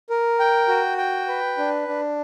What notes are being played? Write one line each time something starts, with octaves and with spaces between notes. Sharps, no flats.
A#4
G5
F#4
G5
B4
D4
D4